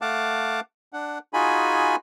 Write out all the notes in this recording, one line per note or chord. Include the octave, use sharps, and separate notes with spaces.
A3 F5 F#5 A5 D6
D4 F#5
D#4 F4 F#4 G#4 G#5 B5